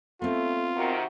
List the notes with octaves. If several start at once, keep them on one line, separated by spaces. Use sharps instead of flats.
A3 B3 C4 F4
C3 D#3 F#4